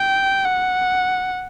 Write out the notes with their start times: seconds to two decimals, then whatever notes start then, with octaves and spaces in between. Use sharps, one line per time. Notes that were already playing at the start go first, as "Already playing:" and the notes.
Already playing: G5
0.45 F#5